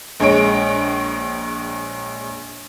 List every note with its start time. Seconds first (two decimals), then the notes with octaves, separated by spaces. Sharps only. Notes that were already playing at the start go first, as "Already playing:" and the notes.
0.20 A#1 G#3 C#5 D7